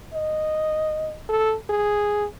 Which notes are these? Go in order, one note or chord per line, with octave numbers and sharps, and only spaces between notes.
D#5
A4
G#4